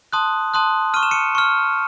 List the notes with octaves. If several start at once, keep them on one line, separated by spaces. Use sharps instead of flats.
A5 C6 D#6 F#6
A5 C6 D#6 F#6
C#6 F6 D#7
E7
C#7 D#7
C#6 F6